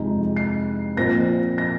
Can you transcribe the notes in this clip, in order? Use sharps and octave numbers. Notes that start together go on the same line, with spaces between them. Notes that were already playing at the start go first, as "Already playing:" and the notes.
Already playing: F2 C3 G#3 D#4
C7
A#2 F3 C4 A#6
A#6